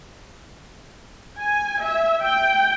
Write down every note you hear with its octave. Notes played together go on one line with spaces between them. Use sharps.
G#5
E5
G5